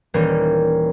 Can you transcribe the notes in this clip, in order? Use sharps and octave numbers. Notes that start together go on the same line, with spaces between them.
D#1 E3 G3 A#3 C#4